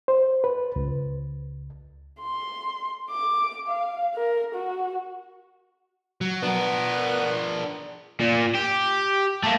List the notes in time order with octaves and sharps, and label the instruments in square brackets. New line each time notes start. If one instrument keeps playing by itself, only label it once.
[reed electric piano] C5
B4
C#2
[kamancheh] C6
D6
F5
A#4
F#4
[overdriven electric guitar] F#3
[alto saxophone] B3 [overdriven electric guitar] D4 A#4
[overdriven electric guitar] A#2
G4
A3 A#3